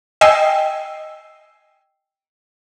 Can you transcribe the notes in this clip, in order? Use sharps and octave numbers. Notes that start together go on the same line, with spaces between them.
D#5 G5 G#5 E6 C7